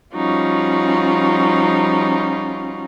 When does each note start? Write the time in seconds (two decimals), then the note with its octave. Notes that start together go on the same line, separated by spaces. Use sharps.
0.14 F3 G3 C#4 D#4 F4 F#4